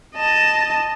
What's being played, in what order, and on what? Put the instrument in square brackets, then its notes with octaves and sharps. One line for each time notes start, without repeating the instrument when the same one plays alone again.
[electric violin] D#5 A5